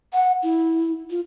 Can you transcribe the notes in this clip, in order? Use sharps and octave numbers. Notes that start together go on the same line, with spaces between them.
F#5
E4
F4